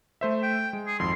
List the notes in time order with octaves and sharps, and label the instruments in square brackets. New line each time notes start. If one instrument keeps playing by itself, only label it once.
[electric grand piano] A3 C5 E5
[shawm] G5
[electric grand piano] G#3
[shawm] G#4
[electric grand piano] G#1 F2 [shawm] C6